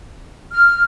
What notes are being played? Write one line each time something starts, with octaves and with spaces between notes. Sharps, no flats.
F6